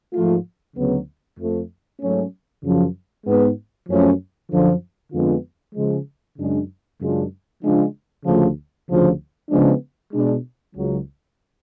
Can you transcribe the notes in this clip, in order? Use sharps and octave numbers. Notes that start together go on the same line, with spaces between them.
G#2 F3 A3 F4
D2 C#3 F#3 B3
F2 F3 A3
G#2 F#3 A3 C#4
F#2 C#3 F3
G#2 G#3 B3
F#2 F3 A3 C#4
F#2 D3 F3
F2 D3 G#3 B3 F4
C#3 F3 G#3
F#2 C#3 G#3 D4
F#2 C#3 G#3 D4 F4
C#3 F3 G#3 D4 F4
D2 C#3 F3 A3 F4
D2 C#3 F3
C#3 F3 G#3 B3 D4
B2 G#3 D4
C#2 C#3 F#3